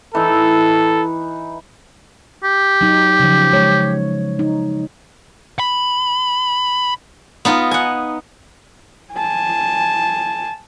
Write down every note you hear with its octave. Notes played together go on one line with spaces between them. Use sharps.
E3 D#4 A4
G4
F#3 D#4
C#3 F3
G#3 C#5
D#4
B5
B3 D#4 F4
F#5 G#5
G#5 A5